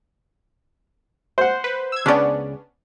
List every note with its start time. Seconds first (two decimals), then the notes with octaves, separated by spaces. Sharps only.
1.38 C5 F#5
1.64 B4
1.92 E6 G#6
2.06 C#2 B3 C#4 D4 D5